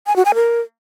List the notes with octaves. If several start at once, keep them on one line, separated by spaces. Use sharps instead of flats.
G#5
F#4
G#5
A#4